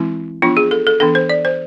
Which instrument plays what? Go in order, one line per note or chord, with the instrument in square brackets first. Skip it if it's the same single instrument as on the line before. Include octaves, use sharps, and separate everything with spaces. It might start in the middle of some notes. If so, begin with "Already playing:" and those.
Already playing: [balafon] E3 G#3 C4 E4
F3 B3 D4 F4
G#4
A4
A4
E3 B3 D4 A4
C5
D5
C5